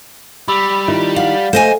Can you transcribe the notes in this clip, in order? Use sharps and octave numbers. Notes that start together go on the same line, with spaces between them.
G3 B5 D6 E6
D#3 E4 F4
D5 F5 F#5
A3 C5 D#5 G#5